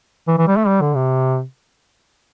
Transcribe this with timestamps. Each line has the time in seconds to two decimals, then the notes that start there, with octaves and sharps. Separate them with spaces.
0.28 E3
0.38 E3
0.48 G3
0.57 A3
0.67 G3
0.81 D3
0.95 C3